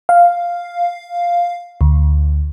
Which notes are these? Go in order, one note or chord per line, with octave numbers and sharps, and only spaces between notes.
F5
D2